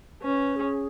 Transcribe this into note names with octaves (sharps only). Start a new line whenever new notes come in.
C#4 B4
G#4